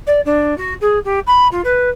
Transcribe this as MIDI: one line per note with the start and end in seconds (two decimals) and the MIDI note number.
0.07 0.20 74
0.25 0.57 62
0.58 0.74 66
0.81 0.99 68
1.05 1.19 67
1.27 1.48 83
1.51 1.61 65
1.64 1.89 71